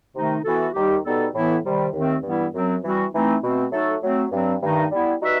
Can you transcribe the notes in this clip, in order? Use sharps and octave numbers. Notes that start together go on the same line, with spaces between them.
C3 D#3 A3 D#4
E3 B3 F#4 A4
D#2 D#3 G3 D#4 G4
B2 G3 B3 D#4 A4
A2 E3 B3 E4
C3 D#3 G3
D#2 D#3 A3 C4
G2 E3 G3 B3 E4
F#2 F#3 C4
E3 G3 C4 F#4
E3 A3 C4 D#4
B2 A3 C4
F#3 A3 D#4 F#4 A4
F#3 A3 C4
G2 F#3 C4
G2 D#3 A3 D#4
G3 B3 E4
G3 D#4 F#4 B4 E5